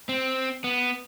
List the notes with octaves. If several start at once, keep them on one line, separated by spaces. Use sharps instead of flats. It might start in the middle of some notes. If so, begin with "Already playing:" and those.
C4
B3